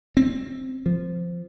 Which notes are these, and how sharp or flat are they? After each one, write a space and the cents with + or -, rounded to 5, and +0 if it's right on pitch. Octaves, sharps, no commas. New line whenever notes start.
C4 +5
F3 -10